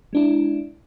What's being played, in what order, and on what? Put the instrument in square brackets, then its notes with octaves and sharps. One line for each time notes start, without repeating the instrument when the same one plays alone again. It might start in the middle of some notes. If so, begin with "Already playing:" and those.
[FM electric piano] G#3 D4 E4